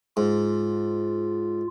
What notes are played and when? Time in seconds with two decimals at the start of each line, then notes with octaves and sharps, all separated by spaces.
0.17 G#2 F4